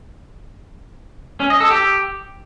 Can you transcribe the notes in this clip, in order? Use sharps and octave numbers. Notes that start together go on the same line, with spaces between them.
C#4
D#5
A4
G4